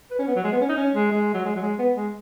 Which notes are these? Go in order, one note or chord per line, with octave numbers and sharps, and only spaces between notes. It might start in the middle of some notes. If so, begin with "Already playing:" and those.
B4
C#4
B3
F#3
G#3
B3
C#4
D#4
C#4
G#3
G#3
F#3
G#3
F#3
G#3
B3
G#3